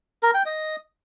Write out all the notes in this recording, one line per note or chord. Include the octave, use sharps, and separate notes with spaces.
A#4
G5
D#5